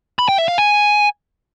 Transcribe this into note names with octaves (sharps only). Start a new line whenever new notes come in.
B5
G5
E5
F5
G#5